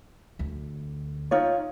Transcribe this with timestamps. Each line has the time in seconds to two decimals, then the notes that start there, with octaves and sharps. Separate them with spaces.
0.39 D2
1.31 D#4 F4 C#5